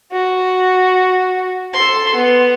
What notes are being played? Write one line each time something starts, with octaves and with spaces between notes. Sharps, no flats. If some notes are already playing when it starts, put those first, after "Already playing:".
F#4
A4 C6
B3